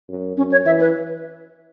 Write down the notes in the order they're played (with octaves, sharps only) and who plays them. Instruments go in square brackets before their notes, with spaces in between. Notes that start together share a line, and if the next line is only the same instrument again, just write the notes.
[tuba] F#2
[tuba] F#2 [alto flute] C#4
[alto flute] C#5
[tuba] E3 [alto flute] E5
[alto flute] B4